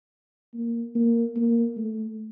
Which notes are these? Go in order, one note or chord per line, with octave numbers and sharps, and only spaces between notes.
A#3
A#3
A#3
A3